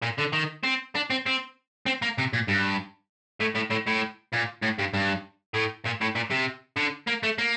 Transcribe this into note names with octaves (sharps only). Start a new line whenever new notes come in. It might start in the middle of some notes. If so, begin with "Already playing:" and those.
A#2
D3
D#3
C4
D4
C4
C4
C4
A#3
C3
A#2
G2
A2
A2
A2
A2
A#2
A2
G2
G2
A2
A#2
A2
A#2
C3
D3
A#3
A3
A#3